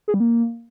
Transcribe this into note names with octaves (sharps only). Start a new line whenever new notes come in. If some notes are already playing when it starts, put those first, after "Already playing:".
G#4
G3
A#3